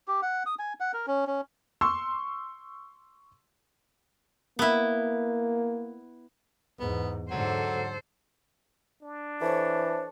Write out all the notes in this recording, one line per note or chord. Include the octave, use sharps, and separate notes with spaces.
G4
F#5
D#6
G#5
F#5
A#4
C#4
C#4
C6 C#6 E6
A#3 B3 E4
E2 G#2 B3
G#2 D3 F#3 A4 C5
D4
E3 A4 C5 C#5